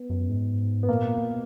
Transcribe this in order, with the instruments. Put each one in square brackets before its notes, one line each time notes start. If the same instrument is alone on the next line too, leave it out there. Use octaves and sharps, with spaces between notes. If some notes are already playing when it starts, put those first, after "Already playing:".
Already playing: [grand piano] B3
[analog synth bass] F#2
G#2
[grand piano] B3
[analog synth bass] A#2 [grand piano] A#3
[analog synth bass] B2